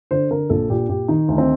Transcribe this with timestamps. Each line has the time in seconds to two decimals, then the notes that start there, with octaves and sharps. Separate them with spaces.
0.11 D3 C5
0.31 D3 A#4
0.50 A#1 A4
0.70 A#2 G4
0.89 A#2 G4
1.08 D#3 D#4
1.28 D2
1.38 C4